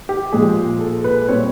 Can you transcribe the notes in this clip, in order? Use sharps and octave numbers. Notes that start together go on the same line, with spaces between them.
G4
A#2 F3 G#3 G#4
A4
B4
A#2 G3 C4 C#5